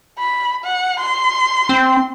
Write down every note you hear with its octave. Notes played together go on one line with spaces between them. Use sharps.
B5
F#5
C6
C4